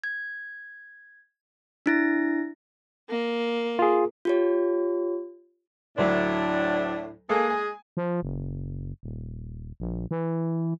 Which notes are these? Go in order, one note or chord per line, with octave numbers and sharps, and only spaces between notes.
G#6
D4 E4 A#6
A#3
F4 G#4
F4 G4 C#5
D2 A2 F#3 D4
G#3 A#3 G#4 A4
G#5
F3
F#1
D#1
A#1
E3